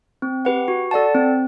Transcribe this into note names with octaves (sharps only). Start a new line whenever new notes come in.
C4
G4 B4 F#5
F#4
A4 D5 F#5 A5
C4